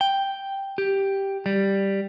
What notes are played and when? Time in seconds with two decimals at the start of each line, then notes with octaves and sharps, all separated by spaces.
0.01 G5
0.78 G4
1.46 G3